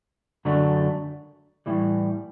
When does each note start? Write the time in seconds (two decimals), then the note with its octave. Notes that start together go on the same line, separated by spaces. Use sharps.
0.45 F#2 D3 F#3 A3 D4
1.66 A2 E3 G3